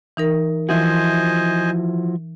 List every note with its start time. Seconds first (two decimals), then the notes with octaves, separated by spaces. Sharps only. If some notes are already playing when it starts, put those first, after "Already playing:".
0.17 E3 D#4 A#4
0.69 E3 F3 E4 F#4 C5 D#5 G#5